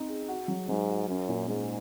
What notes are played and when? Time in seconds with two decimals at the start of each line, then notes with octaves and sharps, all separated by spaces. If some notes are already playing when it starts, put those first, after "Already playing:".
Already playing: C4 D#4
0.08 G#4
0.28 F#4
0.48 F#3
0.68 G#2 F#3
0.89 F#4
1.08 F#2 C#4
1.29 A#2
1.48 G#2 G#3